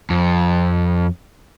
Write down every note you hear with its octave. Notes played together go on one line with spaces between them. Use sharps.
F2